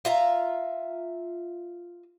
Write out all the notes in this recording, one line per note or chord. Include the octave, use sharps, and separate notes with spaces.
F4 E5 A#5